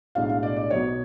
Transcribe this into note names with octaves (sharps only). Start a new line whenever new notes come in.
B1 A2 G#3 D4 F5
F5
D5
D5
B1 B2 F#3 C#5